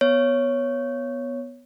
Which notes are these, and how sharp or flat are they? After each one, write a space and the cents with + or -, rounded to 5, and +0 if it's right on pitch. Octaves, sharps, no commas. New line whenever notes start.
B3 +0 C#5 +0